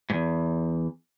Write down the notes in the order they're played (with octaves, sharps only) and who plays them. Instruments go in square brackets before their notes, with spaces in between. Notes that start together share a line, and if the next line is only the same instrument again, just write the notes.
[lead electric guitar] E2 G#2